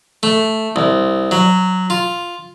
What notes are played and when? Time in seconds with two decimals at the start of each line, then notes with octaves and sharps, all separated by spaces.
0.23 A3
0.76 C2
1.31 F#3
1.90 F4